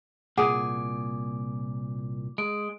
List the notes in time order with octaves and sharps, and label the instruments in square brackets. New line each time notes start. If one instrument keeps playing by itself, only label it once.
[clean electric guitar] C2 A#2 [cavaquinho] G#4 [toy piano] F#5 D#6 [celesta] D6
[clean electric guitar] G#3 [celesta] D7